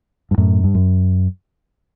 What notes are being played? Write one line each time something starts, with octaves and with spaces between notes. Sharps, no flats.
G2
F#2 A2
G2
F#2